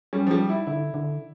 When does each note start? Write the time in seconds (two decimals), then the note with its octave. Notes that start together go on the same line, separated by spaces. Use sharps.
0.13 G3 C#4
0.27 F3
0.31 G3
0.49 E4
0.67 D3 E4
0.94 D3